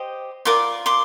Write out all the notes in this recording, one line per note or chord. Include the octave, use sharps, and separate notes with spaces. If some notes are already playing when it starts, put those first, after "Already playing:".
Already playing: G4 C5 D#5
F4 A#4 D5 C6 D6
C6 D6